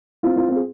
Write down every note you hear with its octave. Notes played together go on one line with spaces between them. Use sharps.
C4 F4
C4 F4
C4 F4
G#4